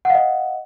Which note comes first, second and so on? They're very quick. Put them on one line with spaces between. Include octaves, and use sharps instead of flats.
F#5 F5 D#5